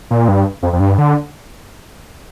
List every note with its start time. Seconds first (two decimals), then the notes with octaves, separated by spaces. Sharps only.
0.11 A#2
0.28 G2
0.63 F2
0.73 F2
0.80 G2
0.98 D3